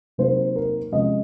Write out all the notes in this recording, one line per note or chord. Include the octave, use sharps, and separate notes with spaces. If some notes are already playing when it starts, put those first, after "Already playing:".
C3 F#3 A#3 D#4 C5
A#4
C3 F3 G#3 C#4 D#5